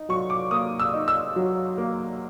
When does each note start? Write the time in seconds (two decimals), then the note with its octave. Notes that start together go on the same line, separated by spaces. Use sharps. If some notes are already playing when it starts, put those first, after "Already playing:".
Already playing: D#4
0.09 F#3 C#6
0.30 D6
0.51 A#3 D#6
0.80 E6
0.94 D#4
1.08 E6
1.36 F#3
1.78 A#3